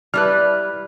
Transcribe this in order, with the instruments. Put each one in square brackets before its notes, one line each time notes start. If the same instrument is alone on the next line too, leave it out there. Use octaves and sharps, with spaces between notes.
[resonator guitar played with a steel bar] G3 E4 B4 [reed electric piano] F6 F#6